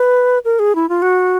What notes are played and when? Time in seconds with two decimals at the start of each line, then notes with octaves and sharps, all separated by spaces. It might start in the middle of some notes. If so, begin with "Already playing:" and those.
Already playing: B4
0.45 A#4
0.59 G#4
0.75 E4
0.89 F4
1.02 F#4